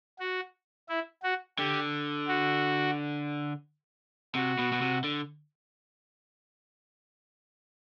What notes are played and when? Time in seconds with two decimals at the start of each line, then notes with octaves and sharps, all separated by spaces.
0.19 F#4
0.89 E4
1.23 F#4
1.58 D3 G4
2.28 F#4
4.35 C3 F#4
4.58 B2
4.72 B2
4.82 C3
5.04 D3